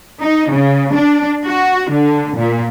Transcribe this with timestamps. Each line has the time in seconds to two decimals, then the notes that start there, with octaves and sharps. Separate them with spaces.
0.22 D#4
0.51 C#3
0.94 D4
1.45 F#4
1.91 D3
2.37 A#2